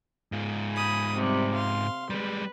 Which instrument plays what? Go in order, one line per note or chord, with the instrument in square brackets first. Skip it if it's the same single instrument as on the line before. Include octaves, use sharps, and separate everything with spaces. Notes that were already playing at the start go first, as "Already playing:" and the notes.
[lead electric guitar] G#2 F4
[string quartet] G#5 B5 D#6
C3 G3
F5 C6
[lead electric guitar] G3 G#3 [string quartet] B4